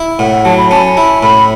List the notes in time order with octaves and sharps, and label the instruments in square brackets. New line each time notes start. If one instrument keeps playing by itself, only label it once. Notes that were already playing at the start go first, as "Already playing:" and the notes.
Already playing: [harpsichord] E4
[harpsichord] A2 [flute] F#5
[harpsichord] F#3 [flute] A5
[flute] B5
[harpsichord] C#4 [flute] A5
[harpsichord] E4 [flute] B5
[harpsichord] A2 [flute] B5